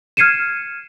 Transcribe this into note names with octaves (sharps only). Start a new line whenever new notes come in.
F6 G#6 C7 C#7 D#7 E7